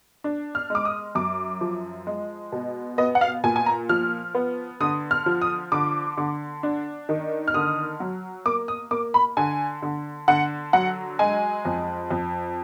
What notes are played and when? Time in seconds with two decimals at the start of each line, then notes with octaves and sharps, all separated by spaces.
0.24 D4
0.55 F6
0.70 G#3
0.75 D6
0.85 D#6
1.15 F#2 D6
1.61 F3
2.07 G#3
2.52 B2
2.98 B3 D#5
3.15 F#5
3.21 F5
3.44 A#2 G#5
3.56 G#5
3.66 A#5
3.89 F3 F6
4.35 B3
4.80 D3 D#6
5.11 F6
5.26 F3
5.42 D#6
5.72 D3 D6
6.17 D3
6.63 D4
7.09 D#3
7.48 F6
7.54 D3 D#6
8.00 F#3
8.46 A#3 D6
8.68 D#6
8.91 A#3 D6
9.14 B5
9.37 D3 G#5
9.82 D3
10.28 D3 F#5
10.73 F#3 F#5
11.19 G#3 G#5
11.65 F2
12.10 F2